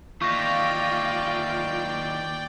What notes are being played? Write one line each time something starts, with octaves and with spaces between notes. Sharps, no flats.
D#2 E3 F4 D5 G5 C#6 A#6